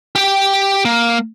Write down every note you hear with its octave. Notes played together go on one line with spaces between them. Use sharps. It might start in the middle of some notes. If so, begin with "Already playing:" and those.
G4 G5
A#3